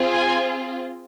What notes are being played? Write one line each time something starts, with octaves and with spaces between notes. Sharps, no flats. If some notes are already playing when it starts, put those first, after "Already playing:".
Already playing: C4 F4 G#4
G#5